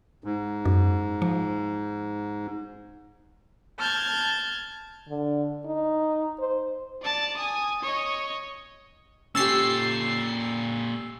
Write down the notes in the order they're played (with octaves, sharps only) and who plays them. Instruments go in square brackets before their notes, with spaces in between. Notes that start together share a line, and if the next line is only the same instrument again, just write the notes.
[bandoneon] G#2
[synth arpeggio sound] F#2
F3
[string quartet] A5 F6 G6 G#6
[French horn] D3
D#4
C5
[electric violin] D5 A5
G#5 D#6
C#5 D#5
[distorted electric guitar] A#2 A4 [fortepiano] C#4 G4 [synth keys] E6 A6 C7